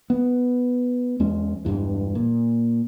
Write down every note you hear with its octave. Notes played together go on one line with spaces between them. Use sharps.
B3
E2 G#3 C#4
E1 B1 G2 E3
A#2